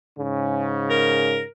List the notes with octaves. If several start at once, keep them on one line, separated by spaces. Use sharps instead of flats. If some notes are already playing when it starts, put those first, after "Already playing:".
G#2 C#3
A#4